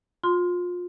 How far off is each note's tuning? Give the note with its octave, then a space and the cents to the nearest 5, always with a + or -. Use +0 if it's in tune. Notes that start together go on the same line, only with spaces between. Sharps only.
F4 +30 C6 -10